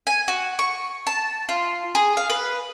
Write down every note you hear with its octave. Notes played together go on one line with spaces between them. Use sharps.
G#5
F#4
C#6
A5
F4
G#4
F5
B4